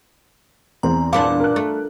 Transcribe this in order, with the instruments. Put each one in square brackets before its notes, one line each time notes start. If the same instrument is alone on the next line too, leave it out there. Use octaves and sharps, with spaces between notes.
[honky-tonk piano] E2 C4 [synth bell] A#5
[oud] A#2 B3 D4 [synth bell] F5 D6
[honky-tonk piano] A#4 F#6
[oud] A3